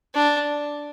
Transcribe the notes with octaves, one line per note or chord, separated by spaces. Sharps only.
D4